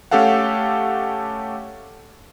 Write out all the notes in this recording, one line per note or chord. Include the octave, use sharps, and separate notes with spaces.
A3 C#4 G4 A4 F5 F#5